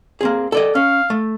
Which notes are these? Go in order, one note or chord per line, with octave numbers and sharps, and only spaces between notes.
A#3 C4 G#4
A4 D5 D#5
C#4 F5
A3